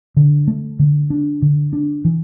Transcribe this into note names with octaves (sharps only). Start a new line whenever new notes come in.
D3
A3
D3
D4
D3
D4
E3